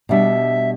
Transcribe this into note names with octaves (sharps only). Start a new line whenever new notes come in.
B2 G3 D4 E5